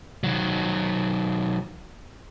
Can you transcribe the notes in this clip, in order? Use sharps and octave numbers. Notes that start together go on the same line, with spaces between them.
D#3 F#3